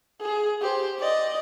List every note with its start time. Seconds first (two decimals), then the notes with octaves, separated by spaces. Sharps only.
0.21 G#4
0.61 G4 C5
0.99 D5 D#5